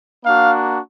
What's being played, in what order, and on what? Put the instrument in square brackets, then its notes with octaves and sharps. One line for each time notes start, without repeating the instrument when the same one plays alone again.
[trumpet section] A#3 D4 F#4 F5